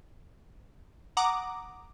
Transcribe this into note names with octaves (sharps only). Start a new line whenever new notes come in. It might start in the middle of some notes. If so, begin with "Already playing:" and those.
F#5 A#5 D6 D#6